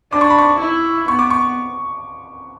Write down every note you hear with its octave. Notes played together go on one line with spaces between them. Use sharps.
D4 D6
C#6
B5
C#6
E4
B3 C#6
D6
C#6